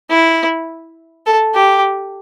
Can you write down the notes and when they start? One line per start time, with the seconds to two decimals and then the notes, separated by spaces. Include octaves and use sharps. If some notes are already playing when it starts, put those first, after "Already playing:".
0.10 E4
1.26 A4
1.55 G4